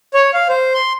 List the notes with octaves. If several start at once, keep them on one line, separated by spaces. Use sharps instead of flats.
C#5
F5
C5
C6